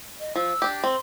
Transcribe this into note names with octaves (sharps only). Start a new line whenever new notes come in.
D#5
F3 E6
D4 G4
C4 C6